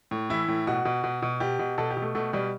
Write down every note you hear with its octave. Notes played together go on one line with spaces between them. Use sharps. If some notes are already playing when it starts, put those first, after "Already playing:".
A2
E3 E4
A2
B2 F#4
B2
B2
B2
B2 G4
B2
B2 A4
G4
B2
A3
B2 A3
B2 G3